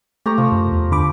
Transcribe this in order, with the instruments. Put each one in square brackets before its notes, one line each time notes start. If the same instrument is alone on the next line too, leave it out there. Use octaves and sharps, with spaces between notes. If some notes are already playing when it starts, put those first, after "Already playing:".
[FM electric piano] A3 [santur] G4 A#5 C#6
[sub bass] C3 [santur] F3
[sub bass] F#2
E2
[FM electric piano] D3 B5 D6